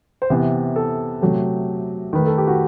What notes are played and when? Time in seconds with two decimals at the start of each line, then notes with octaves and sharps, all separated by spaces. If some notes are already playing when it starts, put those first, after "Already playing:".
0.22 C5
0.30 C3 E3 B3 B4
0.76 A4
1.21 C3 F#3 A3 G4
2.13 D#3 A3 B4
2.27 A4
2.38 G4
2.47 F#4